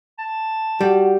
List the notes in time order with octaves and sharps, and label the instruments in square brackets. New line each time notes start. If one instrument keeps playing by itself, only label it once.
[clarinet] A5
[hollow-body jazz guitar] G3 [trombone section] F#4